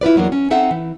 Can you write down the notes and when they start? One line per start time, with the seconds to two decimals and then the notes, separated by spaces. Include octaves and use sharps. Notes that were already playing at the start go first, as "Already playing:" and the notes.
0.01 E4 F4 B4 D5
0.16 E2 F#3 A#3 D4
0.32 C#4
0.50 C4 D#4 A4 E5 F#5
0.71 E3